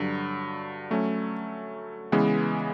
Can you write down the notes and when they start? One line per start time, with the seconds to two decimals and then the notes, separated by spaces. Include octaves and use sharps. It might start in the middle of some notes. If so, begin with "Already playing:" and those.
Already playing: G2 D3 F#3
0.91 F#3 A3 C#4
2.12 C#3 E3 G#3 B3